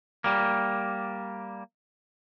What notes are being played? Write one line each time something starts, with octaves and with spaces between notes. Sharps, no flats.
G3 A#3